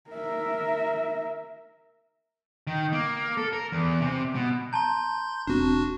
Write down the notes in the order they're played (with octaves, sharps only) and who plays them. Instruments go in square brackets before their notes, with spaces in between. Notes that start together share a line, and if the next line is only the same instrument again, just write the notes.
[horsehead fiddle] A#4 E5
[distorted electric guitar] D#3
A#3
A4
A#4
E2
C3
B2
[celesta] A5 A#5 [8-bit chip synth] C6 G6
[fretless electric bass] E1 C4 [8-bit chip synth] D4 F#4